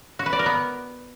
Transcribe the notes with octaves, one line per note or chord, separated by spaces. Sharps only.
F#4
B4
D5
A#4
B3